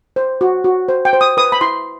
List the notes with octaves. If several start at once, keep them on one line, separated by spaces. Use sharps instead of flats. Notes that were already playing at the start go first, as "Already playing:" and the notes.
C5
F#4
F#4
C5
G5
C5
D#6
B4 D#6
B5
E4 C6